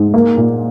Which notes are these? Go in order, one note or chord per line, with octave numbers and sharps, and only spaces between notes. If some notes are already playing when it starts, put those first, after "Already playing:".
Already playing: G#2
A#3
A#2